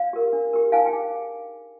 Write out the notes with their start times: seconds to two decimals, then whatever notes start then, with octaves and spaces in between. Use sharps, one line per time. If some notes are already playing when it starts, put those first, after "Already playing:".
Already playing: D5 F5
0.13 G4 A#4
0.33 D4
0.53 G4 A#4
0.72 D#4 F5 G#5
0.86 G5
0.93 G#4